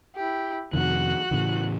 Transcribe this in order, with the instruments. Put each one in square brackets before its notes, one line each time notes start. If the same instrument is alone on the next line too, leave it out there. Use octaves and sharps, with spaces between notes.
[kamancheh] E4 G4
[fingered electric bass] F2 C3 D#3 [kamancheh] F#4 F#6
[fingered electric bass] A2 C#3 E3